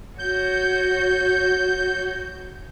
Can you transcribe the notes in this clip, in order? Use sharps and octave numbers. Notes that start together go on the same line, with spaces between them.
F#4 C#5 G6